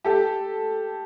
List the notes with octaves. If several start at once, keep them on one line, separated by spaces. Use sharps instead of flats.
G4 A4